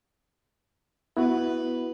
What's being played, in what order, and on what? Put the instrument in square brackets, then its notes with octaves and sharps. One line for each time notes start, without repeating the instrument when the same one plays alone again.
[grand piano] B3 [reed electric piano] E4 F#4 [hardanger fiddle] B4